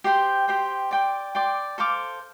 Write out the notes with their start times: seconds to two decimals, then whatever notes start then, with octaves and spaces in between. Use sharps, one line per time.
0.04 G4 C5 G5 C6
0.48 G4 C5 G5 C6
0.91 D5 G5 C6
1.35 D5 G5 C6
1.78 A4 C5 F5 D6